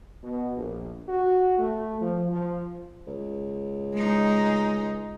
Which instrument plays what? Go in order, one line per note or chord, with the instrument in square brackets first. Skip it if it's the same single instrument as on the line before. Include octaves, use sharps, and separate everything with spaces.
[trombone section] B2
A#1
F#4
A3
F3
F3
[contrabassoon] C#2
[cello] G#3 D#4